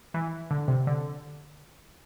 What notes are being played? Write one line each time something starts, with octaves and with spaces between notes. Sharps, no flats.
E3
D3
C3
D3